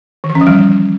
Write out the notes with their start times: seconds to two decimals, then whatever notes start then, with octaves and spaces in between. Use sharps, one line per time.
0.24 D#3
0.30 E3
0.35 C#4
0.41 F3
0.47 G3